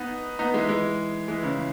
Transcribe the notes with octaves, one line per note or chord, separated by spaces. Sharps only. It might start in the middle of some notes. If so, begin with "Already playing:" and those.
Already playing: B3 D#4
B3 D#4
E3 G#3
E3 G#3
E3 G#3
C#3 E3